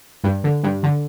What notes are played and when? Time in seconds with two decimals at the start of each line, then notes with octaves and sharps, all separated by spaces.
0.24 G2
0.44 D3
0.63 G2
0.83 D3